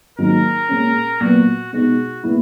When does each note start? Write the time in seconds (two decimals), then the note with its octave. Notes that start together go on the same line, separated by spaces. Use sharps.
0.18 G#2 D#3 F#3 A#3 D#4 A#4
0.69 A#2 G#3 C#4
1.21 A#2 F#3 B3 F#4
1.73 B2 G#3 D#4 F#4
2.23 A#2 G#3 B3 E4